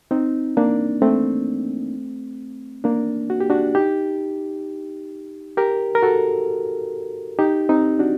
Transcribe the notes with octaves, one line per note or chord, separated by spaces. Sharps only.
C4 D#4
A#3 D4
A3 C4
A#3 D4
F#4
G4
D4 F#4
D#4 G4
G4 A#4
A#4
F#4 A4
D#4 G4
C4 D#4
D4 F#4